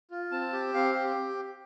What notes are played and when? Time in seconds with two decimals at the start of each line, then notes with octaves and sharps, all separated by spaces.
0.11 F4
0.32 C4 A5
0.53 G4
0.74 C4 F5
0.95 G4